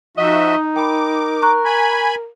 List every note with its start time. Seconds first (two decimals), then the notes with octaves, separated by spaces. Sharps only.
0.17 F3 D#4 F#4 D#5 E5
0.76 A#4 G5 B5 D6
1.42 A#5 C#6 F#6
1.65 G#5 B5